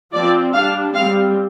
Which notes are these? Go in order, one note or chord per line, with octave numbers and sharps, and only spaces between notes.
F3 C4 D5
G3 D4 F5
G3 C4 F5